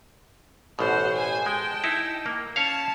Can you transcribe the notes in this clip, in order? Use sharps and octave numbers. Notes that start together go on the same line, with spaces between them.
A1 B2 C5 F#5
C5 G#5
G#3 G5 A5
D#4 E4
A#3
C#4 C#5 F5 A5